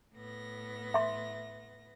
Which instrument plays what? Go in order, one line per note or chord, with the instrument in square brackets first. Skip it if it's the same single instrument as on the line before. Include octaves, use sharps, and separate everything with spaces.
[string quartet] A2 B3 A#6
[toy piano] E5 C6